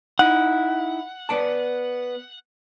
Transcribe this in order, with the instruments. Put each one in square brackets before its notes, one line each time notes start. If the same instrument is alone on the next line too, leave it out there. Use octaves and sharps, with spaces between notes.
[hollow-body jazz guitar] D#4 E4 [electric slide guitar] F#5
[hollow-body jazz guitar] B3 D5 A5